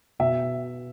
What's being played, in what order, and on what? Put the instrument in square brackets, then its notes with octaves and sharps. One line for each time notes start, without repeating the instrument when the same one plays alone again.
[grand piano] B2 E5